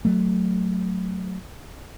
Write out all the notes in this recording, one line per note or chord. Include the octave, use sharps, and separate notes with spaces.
F#3 A3